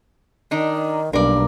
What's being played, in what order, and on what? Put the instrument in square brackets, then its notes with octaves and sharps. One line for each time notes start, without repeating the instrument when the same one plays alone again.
[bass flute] D#3 [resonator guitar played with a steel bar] D4 D#4
[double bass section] B1 [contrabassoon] G2 [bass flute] A#3 [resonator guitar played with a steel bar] A#4 D5